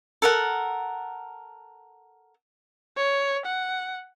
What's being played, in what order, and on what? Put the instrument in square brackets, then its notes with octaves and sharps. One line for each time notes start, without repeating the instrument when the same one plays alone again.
[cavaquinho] A4 A#4 F#5
[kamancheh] C#5
F#5